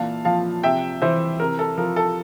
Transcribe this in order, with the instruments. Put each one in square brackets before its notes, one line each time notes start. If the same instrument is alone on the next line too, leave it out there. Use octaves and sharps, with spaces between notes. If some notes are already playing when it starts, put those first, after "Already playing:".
Already playing: [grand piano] A#2 E3 F5 A5
F3 F5 A5
C3 E5 G5
E3 C5 E5
C3 A#4
A4
F3 A#4
A4